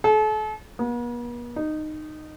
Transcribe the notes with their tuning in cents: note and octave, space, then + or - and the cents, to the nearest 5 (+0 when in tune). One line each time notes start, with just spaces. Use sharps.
A4 -40
B3 -45
D#4 -15